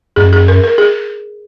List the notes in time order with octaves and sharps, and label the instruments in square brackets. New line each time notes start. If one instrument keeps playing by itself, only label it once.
[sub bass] F#2 [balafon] G#4
[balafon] G#4
A#4
A#4
G#4